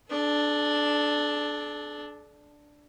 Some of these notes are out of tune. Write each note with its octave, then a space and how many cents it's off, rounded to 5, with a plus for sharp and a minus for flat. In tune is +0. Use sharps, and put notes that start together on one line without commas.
D4 +5 A4 -45